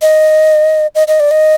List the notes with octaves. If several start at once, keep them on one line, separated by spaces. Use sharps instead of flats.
D#5
D#5
D#5
D5
D#5